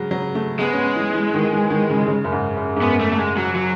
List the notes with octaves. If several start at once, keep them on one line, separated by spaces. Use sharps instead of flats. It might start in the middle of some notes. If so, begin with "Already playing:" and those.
Already playing: C#3 F#3 G#3
F#3
A3
G#3 B3
C#4
B3
E3
E3
D#3
E3
D#3
C#3
C#3
F#2
G#2
F#2
G#2
F#2 B3
A3
A3
G#3
F#3
F#3